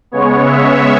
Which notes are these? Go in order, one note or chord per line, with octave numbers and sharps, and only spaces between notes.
C#3 G#3 B3 C#5
E5